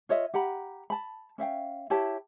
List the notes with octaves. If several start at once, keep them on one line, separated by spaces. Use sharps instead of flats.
F4 C#5 D#5 E5
G4 F#5 A#5 B5
A5 B5
C#4 E5 F5 G5
E4 G4 C#5 A5